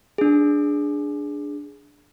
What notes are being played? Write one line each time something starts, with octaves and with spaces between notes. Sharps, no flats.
D4 G#4